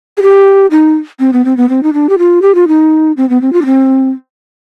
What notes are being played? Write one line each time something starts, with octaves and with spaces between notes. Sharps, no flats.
G#4
G4
D#4
C4
B3
C4
B3
C4
D#4
D4
G4
F4
G4
F4
D#4
C4
B3
C4
F4
D4
C4